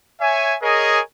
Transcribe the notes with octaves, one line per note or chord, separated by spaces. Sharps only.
C#5 E5 G#5
G#4 A#4 C#5 D#5 G#5